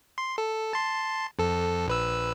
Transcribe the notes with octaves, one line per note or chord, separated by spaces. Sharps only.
C6
A4
A5 C6
F2 A4
A#1 B4 E6